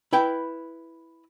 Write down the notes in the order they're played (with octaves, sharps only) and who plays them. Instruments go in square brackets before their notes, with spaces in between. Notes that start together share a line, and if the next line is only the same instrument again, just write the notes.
[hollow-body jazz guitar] E4 B4 G5